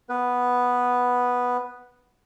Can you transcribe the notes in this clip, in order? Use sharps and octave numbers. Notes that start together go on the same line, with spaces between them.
B3 B4